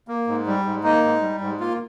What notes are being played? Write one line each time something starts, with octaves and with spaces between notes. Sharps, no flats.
A#3
G#2
G3
G#2
A#3 D#4
G#2
G3
G#2
A#3 F4